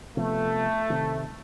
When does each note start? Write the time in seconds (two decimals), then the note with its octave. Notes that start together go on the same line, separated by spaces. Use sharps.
0.17 C3 F3 A3 B3
0.90 C3 D#3